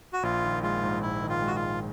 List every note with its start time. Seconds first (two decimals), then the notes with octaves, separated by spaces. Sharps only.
0.13 F#4
0.23 A#1 F4
0.43 D#3
0.63 G#3 F4
0.83 G#2
1.02 A#1 E4
1.23 D#3
1.29 F4
1.42 G#3
1.47 F#4
1.56 F4
1.62 G#2